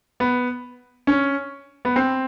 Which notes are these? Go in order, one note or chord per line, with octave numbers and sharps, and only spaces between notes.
B3
C#4
B3
C4